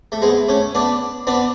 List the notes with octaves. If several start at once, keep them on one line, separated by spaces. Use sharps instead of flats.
A3
G#3 B3
A3 C#4
B3 D4
B3 D4